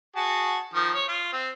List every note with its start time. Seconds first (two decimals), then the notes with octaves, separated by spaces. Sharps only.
0.16 F#4 G#4 A5
0.74 D#3 F3
0.95 C#5
1.08 F4
1.33 C4